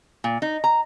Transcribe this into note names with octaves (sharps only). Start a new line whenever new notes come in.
A#2
D#4
A#5